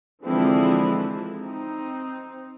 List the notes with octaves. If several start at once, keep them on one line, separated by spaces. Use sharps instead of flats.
D3 E3 F3 G#3 C4 E4
C4 D#4